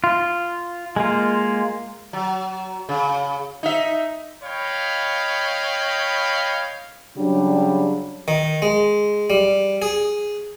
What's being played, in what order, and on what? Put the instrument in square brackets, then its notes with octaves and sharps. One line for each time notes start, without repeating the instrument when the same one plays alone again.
[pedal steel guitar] F4
G#3 A#3 F4
[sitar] F#3
C#3
D#4 E5
[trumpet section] C#5 D#5 F5 G5 B5
[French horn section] C#3 F#3 G3 D4
[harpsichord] D#3
G#3
G3
G#4